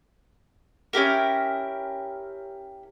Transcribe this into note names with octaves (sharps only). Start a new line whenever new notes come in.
C#4 E4 G4 A#4